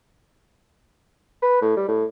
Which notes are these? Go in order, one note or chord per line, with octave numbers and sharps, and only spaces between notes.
B4
A2
G3
A2